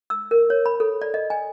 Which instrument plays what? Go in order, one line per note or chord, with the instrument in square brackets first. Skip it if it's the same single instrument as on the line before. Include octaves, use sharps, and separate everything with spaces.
[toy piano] E6
A#4
C#5
B5
A4
D5
D#5
G#5